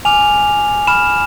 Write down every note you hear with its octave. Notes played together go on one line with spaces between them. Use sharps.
G#5 D6 F6 F7
B5 F6 E7